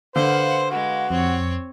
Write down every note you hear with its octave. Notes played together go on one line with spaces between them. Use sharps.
D3 B4 C5 F5 F#5
G#3 F#4 B4
F2 C4 C#5